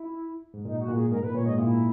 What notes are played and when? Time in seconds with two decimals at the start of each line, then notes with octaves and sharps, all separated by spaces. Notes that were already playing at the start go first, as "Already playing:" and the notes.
Already playing: E4
0.54 G#2
0.65 A#2 D#4
0.80 F#4
0.88 A#2
0.96 G#4
1.11 G#2 A#4
1.23 A#2 B4
1.35 A#2 C#5
1.46 G#2 D#5
1.58 A#2 E4